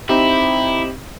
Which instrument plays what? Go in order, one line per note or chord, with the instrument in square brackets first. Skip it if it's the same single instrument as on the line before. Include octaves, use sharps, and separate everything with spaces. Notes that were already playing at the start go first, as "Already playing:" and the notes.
[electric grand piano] C4 D#4 G4 [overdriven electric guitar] E4